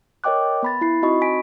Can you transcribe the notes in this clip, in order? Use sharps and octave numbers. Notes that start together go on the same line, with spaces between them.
A#4 C#5 D#5 G5 D6 F#6
B3 B5 A6
E4 B5 C7
C4 D#4 F#4 D#5 B5 C#6
G#5 B6 D7